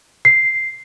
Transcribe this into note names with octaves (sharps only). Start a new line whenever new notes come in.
C7